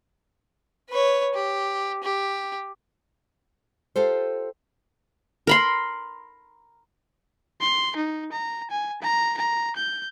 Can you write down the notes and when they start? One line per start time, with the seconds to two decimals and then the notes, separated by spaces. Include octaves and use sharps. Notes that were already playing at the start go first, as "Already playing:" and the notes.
0.90 B4 C#5
1.34 G4
2.04 G4
3.96 F4 G4 A4 C5
5.47 A#4 B5 C6
7.61 C6
7.97 D#4
8.33 A#5
8.71 G#5
9.02 A#5
9.38 A#5
9.76 G6